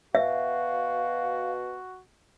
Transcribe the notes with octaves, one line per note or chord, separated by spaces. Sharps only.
B2 F#4 E5 F5